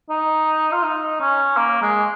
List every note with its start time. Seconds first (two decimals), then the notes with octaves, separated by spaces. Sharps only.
0.10 D#4
0.72 F4
0.83 D#4
1.21 C#4
1.57 A#3
1.82 G#3